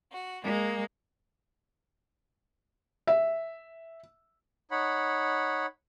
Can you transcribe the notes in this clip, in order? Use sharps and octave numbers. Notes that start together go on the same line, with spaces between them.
F#4
G#3 A#3
E5
D#4 C#5 F#5 B5